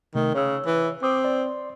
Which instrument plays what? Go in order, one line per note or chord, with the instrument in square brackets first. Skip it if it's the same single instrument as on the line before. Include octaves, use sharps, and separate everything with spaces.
[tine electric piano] C3 A3 [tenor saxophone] D#3
[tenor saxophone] C#3 [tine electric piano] C#5 E6
[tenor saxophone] E3
[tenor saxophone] C4 [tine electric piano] D6 D#6
[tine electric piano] D5 C6